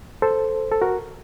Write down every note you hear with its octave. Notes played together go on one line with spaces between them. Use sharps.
A4 C5
A4
F#4 A#4